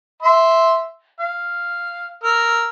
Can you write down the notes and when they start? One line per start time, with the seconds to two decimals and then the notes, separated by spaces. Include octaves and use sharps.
0.22 E5 C6
1.20 F5
2.24 A#4 E6 F6